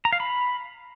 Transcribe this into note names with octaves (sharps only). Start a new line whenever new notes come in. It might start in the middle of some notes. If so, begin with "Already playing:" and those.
A#5
F5
B5